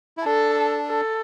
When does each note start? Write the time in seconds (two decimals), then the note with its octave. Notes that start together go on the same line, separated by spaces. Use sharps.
0.17 E4
0.25 D4 A4
0.88 A4